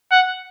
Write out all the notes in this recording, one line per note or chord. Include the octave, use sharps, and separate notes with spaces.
F#5